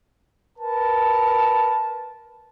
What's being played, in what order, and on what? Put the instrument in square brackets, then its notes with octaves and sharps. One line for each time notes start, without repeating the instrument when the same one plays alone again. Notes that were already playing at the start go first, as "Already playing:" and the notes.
[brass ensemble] A#4 B4 A5